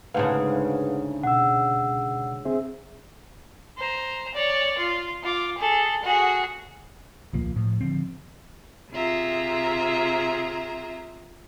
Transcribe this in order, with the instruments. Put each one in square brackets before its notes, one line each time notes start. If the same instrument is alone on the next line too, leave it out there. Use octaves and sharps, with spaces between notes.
[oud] D2 G#2 C#3 [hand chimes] B4 [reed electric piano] F5 F#5 A5
[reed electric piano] B2 [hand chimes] F#5 E6
[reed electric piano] C4 G#4 E5
[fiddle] C5 A#5
C#5 D5
F4
F4 D6
G#4 A4
F#4 G#4
[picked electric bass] D#1 C2 F3 A#3
A2 F3
D3 F3 C4
[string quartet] C3 C4 F4 G#4 E5 A#5